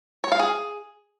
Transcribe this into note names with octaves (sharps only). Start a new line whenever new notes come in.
C#5
F5
G#4